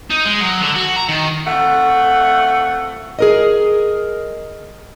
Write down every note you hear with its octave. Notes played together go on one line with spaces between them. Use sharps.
D#4
G#3
F#3
D3
F#4
A#5
D#3
F2 A3 F#5
G#4 A#4 D#5